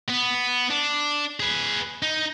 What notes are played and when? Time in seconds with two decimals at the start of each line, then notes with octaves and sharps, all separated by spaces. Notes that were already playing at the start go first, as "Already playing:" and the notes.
0.09 B3
0.70 D4
1.40 G#4 B4
2.02 D#4